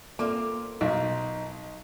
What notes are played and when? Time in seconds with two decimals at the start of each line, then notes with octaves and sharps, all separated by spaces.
0.19 A#3 C4 F4 A4 D5 E5 D6
0.81 B1 D#4 F5 A#5